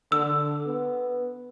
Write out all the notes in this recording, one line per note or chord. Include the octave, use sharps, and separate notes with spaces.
D3 E6
B3